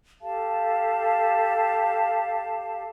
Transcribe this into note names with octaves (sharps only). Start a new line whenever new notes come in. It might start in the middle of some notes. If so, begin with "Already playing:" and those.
G4 A4 F5 A5